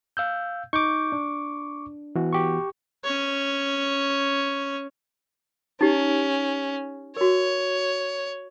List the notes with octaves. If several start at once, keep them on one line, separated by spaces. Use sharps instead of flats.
F5 E6 G6
D#4 C#6 D6 G6
D4
E3 B3 F#4
G4 C#6
C#4 C#5
C#4 D#4 G4
F#4 A#4 C#5